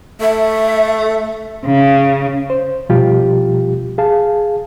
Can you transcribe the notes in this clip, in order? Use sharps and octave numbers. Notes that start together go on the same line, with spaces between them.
A3 E5
C#3
C5
B2 F3 G3 F4 G4
G#4 F5 A5